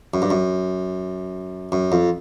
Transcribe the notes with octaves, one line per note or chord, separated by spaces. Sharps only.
F#2
G2
F#2
F#2
F2